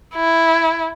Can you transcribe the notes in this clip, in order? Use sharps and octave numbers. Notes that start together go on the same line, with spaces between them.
E4